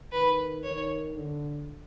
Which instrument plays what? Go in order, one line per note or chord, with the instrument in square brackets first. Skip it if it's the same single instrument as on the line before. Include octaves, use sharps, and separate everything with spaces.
[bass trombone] D#3 [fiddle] B4
[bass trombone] D#3 [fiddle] C#5
[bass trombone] D3